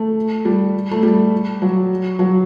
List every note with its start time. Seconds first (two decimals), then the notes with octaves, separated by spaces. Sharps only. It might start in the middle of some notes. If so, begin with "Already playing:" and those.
Already playing: A3
0.45 G3
0.91 A3
1.03 G3
1.62 F#3
2.19 F#3